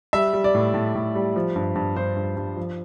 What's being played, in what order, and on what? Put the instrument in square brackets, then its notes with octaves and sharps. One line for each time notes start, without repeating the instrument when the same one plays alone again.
[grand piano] G3 E5
G3
D5
A2
A2
A2
G3
F3
G2
G2
G2 C5
G2
G2
F3